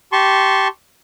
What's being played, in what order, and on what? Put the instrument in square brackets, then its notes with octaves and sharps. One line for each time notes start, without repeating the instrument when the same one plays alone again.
[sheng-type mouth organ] G4 A5 C6 C#6